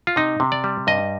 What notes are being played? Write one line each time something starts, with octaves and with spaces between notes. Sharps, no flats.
F4
C3 D#4
C3
D5
G3
G2 D#5